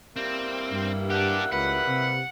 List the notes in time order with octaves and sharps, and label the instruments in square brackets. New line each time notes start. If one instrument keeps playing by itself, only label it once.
[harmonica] G3 A#3 E4 [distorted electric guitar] C4
[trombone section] G2
[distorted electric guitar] D4 G4 [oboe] F#5
[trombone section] C#2 [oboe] B4 [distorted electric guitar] F#5
[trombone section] C3